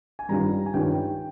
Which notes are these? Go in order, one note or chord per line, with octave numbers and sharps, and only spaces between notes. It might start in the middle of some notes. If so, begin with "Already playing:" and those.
G#5
G2 D#3 G3 C#4 F4 A#5
G#5
G2 D#3 G3 C#4 F4 G5